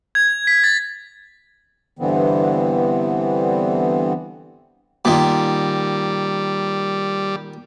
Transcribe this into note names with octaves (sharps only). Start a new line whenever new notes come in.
G#6
B6
A6
G2 D3 E3 B3 C4
A#2 D#3 G3